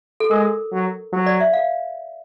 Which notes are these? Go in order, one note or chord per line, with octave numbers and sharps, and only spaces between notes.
A4
G#3 A#4
F#3
F#3
D5
E5
F5